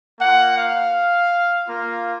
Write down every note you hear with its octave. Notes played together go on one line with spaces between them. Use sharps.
A#3 F4 F#5
F5
A#3 F4